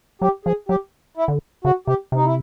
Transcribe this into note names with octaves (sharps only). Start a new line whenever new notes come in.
F#3 G4
F3 G#4
F#3 G4
E4
D3
C#3 F#4
C3 G4
C3 D#4
E4